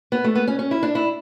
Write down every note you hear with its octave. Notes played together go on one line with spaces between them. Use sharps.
B3
A3
B3
C#4
C#4
E4
D4
E4